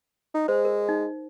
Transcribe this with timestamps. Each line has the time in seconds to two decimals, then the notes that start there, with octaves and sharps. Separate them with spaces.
0.34 D#4
0.48 G#3 C5
0.65 A#4
0.89 D#4